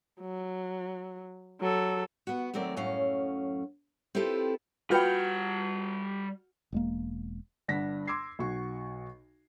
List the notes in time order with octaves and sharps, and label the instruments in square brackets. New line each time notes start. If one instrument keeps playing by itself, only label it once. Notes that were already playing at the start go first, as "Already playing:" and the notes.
[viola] F#3
F#3 A4
[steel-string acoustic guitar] B3 F#4
D#2 F#3 A3 C4 A#4 D5
F#2 A2 F#3 C#4 F5
C4 E4 F4 G4 A4 B4
[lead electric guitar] G3 F#5 [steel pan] F4 B4 G5 [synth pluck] F#4 F6 G6
[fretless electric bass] E1 G#3 A#3
[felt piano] G1 G2 D4 F#5 A#6 B6
C6 D6 E6 G#6 C7
B1 F#4 C#6